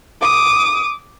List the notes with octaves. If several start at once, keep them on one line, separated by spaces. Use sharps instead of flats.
D6 D#6